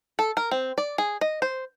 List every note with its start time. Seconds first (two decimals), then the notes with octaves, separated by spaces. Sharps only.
0.19 A4
0.37 A#4
0.51 C4
0.78 D5
0.98 G#4
1.21 D#5
1.42 C5